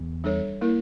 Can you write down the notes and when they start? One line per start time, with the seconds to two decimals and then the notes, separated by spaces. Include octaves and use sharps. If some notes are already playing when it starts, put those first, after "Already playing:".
Already playing: E2
0.24 G3 D4 A4 C#5
0.61 A#3 E4 A#4